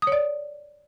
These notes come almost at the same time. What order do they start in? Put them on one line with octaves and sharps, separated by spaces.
D#6 C#5 D5